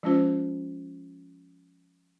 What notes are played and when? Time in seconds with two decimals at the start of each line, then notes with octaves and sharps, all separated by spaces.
0.03 F3 G#3 C#4 F4 C5